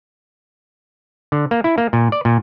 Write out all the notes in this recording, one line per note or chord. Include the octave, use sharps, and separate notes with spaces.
D3
A#3
E4
A#3
A#2
D5
A#2